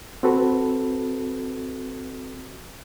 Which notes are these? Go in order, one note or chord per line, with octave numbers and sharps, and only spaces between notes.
C4 F#4 A4 B4